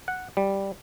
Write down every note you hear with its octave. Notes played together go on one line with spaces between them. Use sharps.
F#5
G3